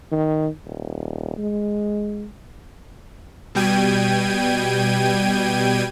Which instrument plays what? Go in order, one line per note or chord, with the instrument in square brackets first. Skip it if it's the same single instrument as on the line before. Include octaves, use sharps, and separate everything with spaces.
[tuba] D#3
D#1
G#3
[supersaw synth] B2 G3 G5 G#6 D#7